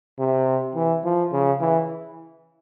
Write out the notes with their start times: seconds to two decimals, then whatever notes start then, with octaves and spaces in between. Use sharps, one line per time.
0.19 C3
0.75 E3
1.04 F3
1.33 C#3
1.61 E3